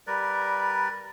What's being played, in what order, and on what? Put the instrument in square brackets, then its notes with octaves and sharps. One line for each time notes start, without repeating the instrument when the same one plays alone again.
[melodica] G3 A#4 B4 D5